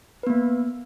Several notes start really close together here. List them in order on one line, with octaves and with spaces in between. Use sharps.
B4 B3 A#3